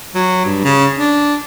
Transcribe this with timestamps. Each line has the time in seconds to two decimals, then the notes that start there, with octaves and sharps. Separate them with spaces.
0.15 F#3
0.45 G2
0.64 C#3
0.98 D4